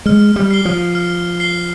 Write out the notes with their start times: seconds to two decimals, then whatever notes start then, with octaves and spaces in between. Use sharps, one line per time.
0.06 G#3 F6
0.36 G3
0.51 C7 G7
0.65 F3
0.95 F6
1.40 C7 G7